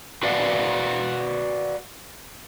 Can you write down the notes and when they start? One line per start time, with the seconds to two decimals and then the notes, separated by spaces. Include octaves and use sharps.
0.23 F#4 B4 D5 F5 F#5